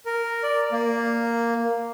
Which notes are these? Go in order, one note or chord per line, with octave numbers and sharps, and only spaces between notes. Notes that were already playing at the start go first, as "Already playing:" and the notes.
A#4
D5
A#3